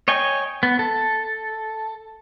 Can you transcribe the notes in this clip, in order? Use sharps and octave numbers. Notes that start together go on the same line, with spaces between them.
C#5 D#5 G5 G#5
B3
A4